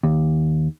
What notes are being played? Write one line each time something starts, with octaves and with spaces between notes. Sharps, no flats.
D#2